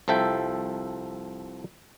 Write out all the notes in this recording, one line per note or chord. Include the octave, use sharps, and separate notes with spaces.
C2 F3 A4 E5 G5